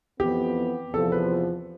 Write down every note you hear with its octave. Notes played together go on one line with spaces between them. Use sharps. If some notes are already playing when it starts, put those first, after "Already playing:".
F2 E3 B3 G4
E2 C3 F3 A4
B4